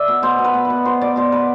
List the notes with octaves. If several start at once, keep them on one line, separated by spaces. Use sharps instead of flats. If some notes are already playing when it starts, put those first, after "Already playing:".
Already playing: D5 E5
B2
B2 C5
B2
B4
B2
B4
B2
B2 C5
B2 D5
B2 C5
B2 B4